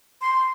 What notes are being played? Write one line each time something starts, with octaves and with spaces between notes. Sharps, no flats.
C6